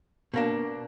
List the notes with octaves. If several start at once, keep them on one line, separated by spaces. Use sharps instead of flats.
B2 A#3 D4